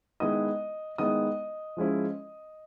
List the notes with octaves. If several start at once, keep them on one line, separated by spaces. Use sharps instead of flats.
D#3 G#3 B3 E4 D#5 D#6
D#3 G#3 B3 E4 D#5 D#6
F3 G#3 C#4 E4